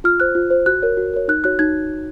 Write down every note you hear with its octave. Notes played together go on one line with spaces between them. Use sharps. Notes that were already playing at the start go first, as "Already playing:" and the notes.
F4 F6
C5 F#6
F4
C5
F#4 F#6
A#4 C#5
F#4
A#4 C#5
D#4 F#6
F#4 C#5 F#6
D#4 G#6